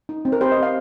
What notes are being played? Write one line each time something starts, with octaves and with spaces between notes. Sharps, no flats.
D#4
C4
A#4
G4 C5
D#5
C4
F5